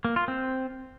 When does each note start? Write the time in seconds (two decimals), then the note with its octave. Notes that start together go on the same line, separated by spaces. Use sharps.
0.05 A#3
0.16 F4
0.28 C4